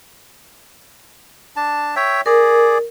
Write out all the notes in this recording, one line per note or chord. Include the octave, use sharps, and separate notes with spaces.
D4 A5
C#5 E5 G5
G#4 A#4 D5